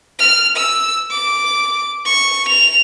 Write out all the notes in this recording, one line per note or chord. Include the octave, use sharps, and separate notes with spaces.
F6
E6
D6
C#6
F7